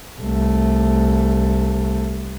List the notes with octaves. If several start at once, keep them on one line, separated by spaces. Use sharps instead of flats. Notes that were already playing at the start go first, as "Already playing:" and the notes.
C2 A3